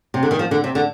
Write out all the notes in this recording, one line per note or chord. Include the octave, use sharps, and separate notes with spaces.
C3
D3
D#3
F3
D3
C3
D3